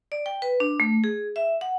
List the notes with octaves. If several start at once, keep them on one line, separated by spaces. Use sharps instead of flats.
D5
G5
B4
D4
A3
G#4
E5
F#5